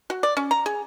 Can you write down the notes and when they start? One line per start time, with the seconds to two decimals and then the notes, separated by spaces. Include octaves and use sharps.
0.10 F#4
0.23 D5
0.37 C#4
0.51 A#5
0.66 G#4